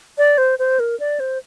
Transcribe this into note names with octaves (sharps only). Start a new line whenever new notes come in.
D5
C5
C5
A#4
D5
C5